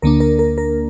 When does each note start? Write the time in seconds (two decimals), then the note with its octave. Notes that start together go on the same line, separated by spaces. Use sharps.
0.02 D2 D3 A#3 D4 A#4
0.20 A#4
0.39 A#4
0.58 A#4